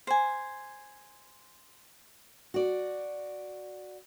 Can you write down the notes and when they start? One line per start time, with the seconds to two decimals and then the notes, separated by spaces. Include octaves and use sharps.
0.07 C5 G#5
2.54 F#4 D5